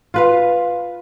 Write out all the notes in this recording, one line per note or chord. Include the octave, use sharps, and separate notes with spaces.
F4 B4 F5